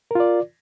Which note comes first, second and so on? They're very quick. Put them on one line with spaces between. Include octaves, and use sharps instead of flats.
A#4 F4 D5